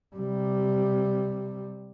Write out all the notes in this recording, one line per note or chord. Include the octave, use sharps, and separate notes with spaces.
C3 G3